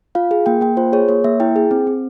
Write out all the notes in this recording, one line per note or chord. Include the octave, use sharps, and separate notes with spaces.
F4 F5
G#4
A#3 G5
A#3 G5
F4 C5
G#4 C#5
A#3 C#5
A#3 E5
E4 G5
G#4
C4
C4